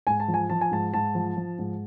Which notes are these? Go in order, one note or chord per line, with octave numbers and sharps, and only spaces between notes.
G#2 G#5
A5
F3
G#5
F3 A5
G#5
G#2 A5
G#2 A5
F3
F3
G#2